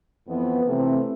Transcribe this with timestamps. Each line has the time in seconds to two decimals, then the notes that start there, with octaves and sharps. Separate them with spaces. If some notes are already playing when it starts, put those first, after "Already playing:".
0.26 F2 E3 B3
0.65 C3 E3 A3 C4